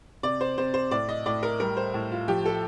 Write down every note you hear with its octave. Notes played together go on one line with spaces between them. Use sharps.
C3 D5
C5
C3 C5
C5
A2 D5
D#5
A2 D5
A#4
G3 A#4
C5
A2
F4
F3 G4
A4